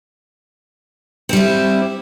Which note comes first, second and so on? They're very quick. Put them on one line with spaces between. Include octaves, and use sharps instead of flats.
C4 G3 E4